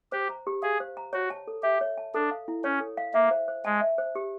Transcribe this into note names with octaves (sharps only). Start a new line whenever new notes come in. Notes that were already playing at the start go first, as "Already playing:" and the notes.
G4 C5
A#5
G4
G#4 F5
C5
A#5
F#4 C#5
A5
A4
G4 E5
C#5
A5
D4 A4
F5
E4
C#4 C#5
A4
F5
A#3 E5
C5
C5
G#3 A5
E5
C5
G4